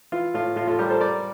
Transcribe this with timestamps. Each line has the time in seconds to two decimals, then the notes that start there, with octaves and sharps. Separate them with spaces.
0.12 E3 F4
0.34 A2 F4
0.56 A2 F4
0.68 F4 A4
0.79 G3 G4 A#4
0.90 A4 C5
1.01 G3 A#4 D5